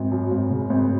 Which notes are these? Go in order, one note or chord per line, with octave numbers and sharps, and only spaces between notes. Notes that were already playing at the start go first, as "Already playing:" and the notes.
Already playing: G#1
F#2
G#1
C#3
G#1